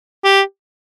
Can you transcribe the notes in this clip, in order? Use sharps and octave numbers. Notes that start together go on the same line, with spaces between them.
G4